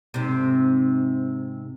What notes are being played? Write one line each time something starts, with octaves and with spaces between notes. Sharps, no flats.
G#2 C3